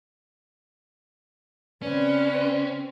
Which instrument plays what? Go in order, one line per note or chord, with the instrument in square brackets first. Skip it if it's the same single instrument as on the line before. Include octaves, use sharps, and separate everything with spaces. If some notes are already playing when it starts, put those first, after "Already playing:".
[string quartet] C#3 C4 [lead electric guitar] C#4 [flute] B4 [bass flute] D5